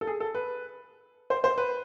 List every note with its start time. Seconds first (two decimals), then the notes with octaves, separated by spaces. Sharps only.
0.01 A4
0.07 G#4
0.20 A4
0.35 B4
1.30 C5
1.44 C5
1.58 B4